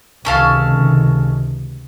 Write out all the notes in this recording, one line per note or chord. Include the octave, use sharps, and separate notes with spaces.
C#2 C3 D#3 C#4 A4 F5